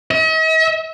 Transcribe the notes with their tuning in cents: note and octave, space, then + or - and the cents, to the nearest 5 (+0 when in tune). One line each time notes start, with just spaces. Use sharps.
D#5 +45